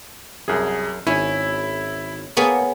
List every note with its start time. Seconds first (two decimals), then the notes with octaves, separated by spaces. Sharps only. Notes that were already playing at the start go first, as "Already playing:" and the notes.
0.48 C2 F#2 G#4
1.07 G#1 C#4 E4
2.37 A#3 B3 G#4 C#5 A5